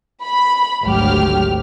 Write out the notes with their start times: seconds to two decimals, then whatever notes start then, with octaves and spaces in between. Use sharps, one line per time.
0.24 B5
0.83 G#1 D2 F#3 G4 F6